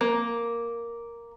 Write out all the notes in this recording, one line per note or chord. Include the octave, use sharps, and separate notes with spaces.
A#3